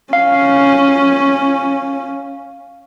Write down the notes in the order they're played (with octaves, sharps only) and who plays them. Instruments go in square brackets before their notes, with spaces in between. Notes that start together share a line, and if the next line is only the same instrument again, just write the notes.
[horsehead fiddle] C#4 [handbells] F5